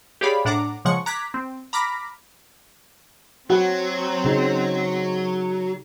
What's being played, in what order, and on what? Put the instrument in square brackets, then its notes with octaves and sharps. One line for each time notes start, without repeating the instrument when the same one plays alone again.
[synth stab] G4 G#4 C#5 D5 F5 B5
A2 D4 F#5 A#5 D6
C#3 F3 G#3 F#5 C#6 C#7
A#5 D6 F#6 G#6 B6
C4
A#5 B5 D6 F6 A#6 B6
[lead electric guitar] F#3 [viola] C4 [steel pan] F#4 F#5
[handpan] C#3 D#4